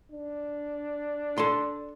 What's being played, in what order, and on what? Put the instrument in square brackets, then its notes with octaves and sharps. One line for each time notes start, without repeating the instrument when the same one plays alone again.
[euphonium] D4
[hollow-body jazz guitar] A4 C6